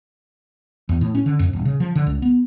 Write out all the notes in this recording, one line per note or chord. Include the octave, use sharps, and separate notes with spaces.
E2
A2
C#4
D3
F2
D#1
C#3
F3
D3
C#2
B3